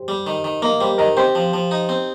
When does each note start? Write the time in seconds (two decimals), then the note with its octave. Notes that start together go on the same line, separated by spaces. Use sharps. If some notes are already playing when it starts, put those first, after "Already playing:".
Already playing: G4 C5
0.08 G3
0.27 D#3
0.44 D#3
0.62 A#3 A#4 D#5
0.81 G3 G4 C5
0.98 D#3 A#4 D#5
1.17 C4 G4 C5
1.35 F3
1.53 F3
1.71 D#4
1.89 C4